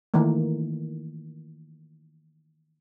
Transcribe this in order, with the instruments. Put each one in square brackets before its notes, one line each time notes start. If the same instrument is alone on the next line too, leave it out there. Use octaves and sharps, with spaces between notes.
[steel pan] D#3 E3 A3 A#3